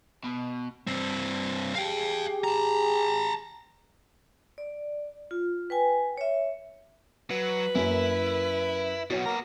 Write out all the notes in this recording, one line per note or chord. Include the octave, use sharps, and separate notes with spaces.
B2
G2 C4
G4 G#4 F5 G5
A5 A#5
D5
F4
B4 G5 G#5
C#5 E5
F#3 B4
F#2 F#3 A#3 E4
B2 F#3 F#4 C#5 F#5
A#3 B3 A#5